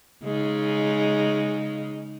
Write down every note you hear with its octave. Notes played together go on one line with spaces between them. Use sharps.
C#3 G#3 D#4